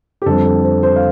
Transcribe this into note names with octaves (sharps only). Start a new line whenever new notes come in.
G4
F2 D3 G3 C4 A4
A4
C5
C5
F5